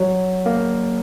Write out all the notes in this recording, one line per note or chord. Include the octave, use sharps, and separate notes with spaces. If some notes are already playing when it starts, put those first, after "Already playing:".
Already playing: F#3
A#3